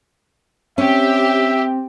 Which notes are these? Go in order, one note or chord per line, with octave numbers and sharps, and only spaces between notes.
C4 C#4 G4 E5